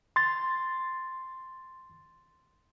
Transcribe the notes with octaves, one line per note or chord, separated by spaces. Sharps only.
C6 A6